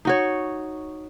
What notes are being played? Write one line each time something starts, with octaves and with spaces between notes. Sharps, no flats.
D#4 F#4 C#5